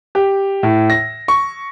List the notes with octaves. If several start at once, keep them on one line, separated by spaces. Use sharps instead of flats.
G4
A2
A#6
C#6